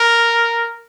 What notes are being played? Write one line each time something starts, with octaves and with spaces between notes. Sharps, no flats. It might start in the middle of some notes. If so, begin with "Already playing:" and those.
Already playing: A#4